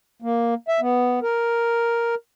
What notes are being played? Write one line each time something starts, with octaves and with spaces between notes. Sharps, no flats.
A#3
E5
B3
A#4